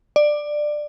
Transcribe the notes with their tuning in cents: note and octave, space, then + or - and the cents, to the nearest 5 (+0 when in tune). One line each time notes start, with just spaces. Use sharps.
D5 +15